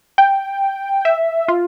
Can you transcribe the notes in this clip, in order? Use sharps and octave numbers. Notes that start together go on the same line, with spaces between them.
G5
E5
F4